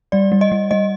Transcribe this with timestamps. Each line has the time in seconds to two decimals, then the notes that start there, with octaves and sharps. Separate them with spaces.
0.12 G3 D5
0.32 G3
0.41 D#5
0.52 G3
0.71 G3 D#5